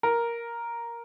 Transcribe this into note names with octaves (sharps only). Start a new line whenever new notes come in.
A#4